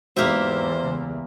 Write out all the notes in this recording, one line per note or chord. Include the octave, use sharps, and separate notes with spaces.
E2 G#2 F#3 A#3 G4 C5 E5
C#2